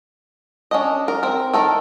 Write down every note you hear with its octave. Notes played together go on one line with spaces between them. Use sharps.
C#4 D4 D#5
A#4
C4 A#4
D#3 A4 A#4